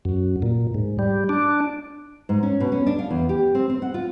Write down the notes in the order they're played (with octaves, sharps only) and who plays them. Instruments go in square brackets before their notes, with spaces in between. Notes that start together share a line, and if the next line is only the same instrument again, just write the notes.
[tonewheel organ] F#2
A#2
G#2
G3
D4
[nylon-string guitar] G#2
C#4
B2
C#4
D4
F5
E2
G4
C4
C4
F#5
F4